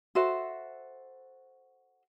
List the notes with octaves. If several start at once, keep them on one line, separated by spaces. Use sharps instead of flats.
F#4 A4 C5 E5